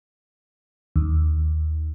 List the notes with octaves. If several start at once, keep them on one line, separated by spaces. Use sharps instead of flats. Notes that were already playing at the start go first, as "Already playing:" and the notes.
D#2